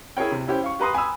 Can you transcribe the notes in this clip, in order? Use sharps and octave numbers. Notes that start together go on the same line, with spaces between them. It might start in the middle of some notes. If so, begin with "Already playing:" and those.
E4 G#4 A#4 C#5 G5
C3
C#4 E4 G4 C5
F5 C#6
G4 B4 A#5 C6 D#6
G#5 B5 D#6 E6